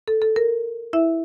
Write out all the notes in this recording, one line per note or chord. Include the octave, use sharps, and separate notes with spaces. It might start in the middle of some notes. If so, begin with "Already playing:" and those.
A4
A4
A#4
E4 E5